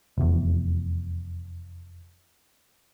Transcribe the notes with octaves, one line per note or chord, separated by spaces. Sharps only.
F1 E2